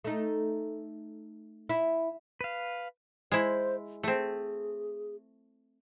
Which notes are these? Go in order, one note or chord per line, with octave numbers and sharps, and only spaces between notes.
A3 D#4
E4
B4 F5
G#3 E4 C5
A3 C4 G#4